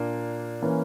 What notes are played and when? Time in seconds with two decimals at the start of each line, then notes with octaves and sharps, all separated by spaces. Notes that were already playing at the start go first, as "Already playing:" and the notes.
Already playing: A#2 A#3 D4
0.62 E3 A#3 C#4